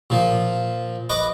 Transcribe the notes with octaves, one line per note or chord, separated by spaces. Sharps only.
A#2 F3
B4 D#5 D6